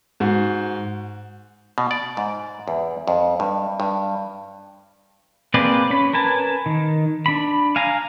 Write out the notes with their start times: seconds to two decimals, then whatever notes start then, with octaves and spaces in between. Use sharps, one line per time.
0.20 G#2 F#4
1.78 B2
1.91 D5
2.17 G#2
2.68 E2
3.08 F2
3.40 G2
3.80 G2
5.54 A#3 C4 G#4 B4 D5
5.90 C#4 B5
6.13 A#4 B4 G#5 A5
6.66 D#3
7.26 D4 B5
7.76 F5 G#5 A#5